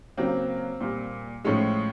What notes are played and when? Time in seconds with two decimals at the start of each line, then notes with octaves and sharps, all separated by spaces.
0.18 C#3 F#3 A#3 C4
0.80 A#2 G3 A#3
1.45 A2 F3 G#3 C#4